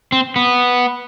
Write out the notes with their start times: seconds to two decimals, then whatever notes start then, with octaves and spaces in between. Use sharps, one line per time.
0.12 C4
0.36 B3